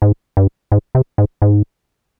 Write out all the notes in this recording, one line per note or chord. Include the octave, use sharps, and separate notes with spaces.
G#2
G2
G#2
C3
G#2
G#2